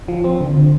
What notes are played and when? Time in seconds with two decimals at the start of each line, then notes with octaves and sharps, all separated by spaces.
0.08 F3
0.24 C4
0.41 D3